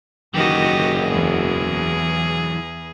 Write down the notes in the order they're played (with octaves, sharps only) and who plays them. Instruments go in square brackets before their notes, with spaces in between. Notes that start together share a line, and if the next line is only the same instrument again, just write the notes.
[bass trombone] F#1 [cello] D#3 F#4 [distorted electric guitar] E3 F#3 [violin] G4 D#5
[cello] E2 [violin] G#4